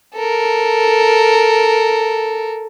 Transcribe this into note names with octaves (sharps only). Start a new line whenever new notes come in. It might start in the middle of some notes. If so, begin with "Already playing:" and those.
A4 A#4